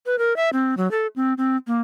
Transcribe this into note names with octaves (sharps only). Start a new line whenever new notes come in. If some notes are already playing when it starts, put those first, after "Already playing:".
B4
A#4
E5
C4
F#3
A4
C4
C4
A#3